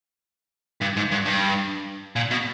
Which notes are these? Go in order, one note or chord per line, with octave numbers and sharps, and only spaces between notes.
G2
G#2
G2
G2
A#2
B2